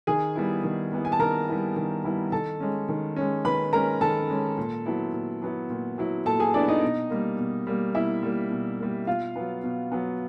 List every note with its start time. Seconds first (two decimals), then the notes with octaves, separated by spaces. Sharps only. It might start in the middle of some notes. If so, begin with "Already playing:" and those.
0.07 D#3 G#4 G#5
0.35 G3 B3 E4
0.63 D#3
0.92 G3 B3 E4
1.05 G#5
1.12 A5
1.19 D#3 A#4 A#5
1.48 G3 B3 E4
1.76 D#3
2.04 G3 B3 E4
2.32 D#3 A4 A5
2.60 G#3 C#4
2.89 D#3
3.16 G#3 C#4
3.45 D#3 B4 B5
3.73 G#3 C#4 A#4 A#5
4.01 D#3 A4 A5
4.29 G#3 C#4
4.58 A#2
4.86 F#3 B3 E4
5.13 A#2
5.42 F#3 B3 E4
5.70 A#2
5.98 F#3 B3 E4
6.26 A#2 A4 A5
6.40 G#4 G#5
6.54 F#3 B3 D4 E4 D5
6.68 D#4 D#5
6.82 B2
7.10 G3 A#3
7.38 B2
7.67 G3 A#3
7.95 B2 E4 E5
8.23 G3 A#3
8.51 B2
8.79 G3 A#3
9.07 B2 F4 F5
9.36 F#3 B3
9.64 B2
9.92 F#3 B3